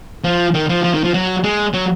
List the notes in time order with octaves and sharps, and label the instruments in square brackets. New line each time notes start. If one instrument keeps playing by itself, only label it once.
[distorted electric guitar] F3
D#3
F3
F3
D#3
F3
F#3
G#3
F#3